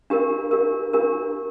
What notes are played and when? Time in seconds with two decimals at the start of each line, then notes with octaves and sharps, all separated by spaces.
0.10 D4 G4 A#4
0.51 D4 G4 A#4
0.93 D4 G4 A#4